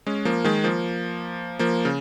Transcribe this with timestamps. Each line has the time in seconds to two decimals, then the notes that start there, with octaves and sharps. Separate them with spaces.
0.07 G#3 C#4
0.25 F3 A#3
0.44 D#3 G#3
0.64 F3 A#3
1.59 F3 A#3
1.85 C#3